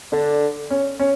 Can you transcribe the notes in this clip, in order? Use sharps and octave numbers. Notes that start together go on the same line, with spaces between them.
D3 D4
C#4
C#4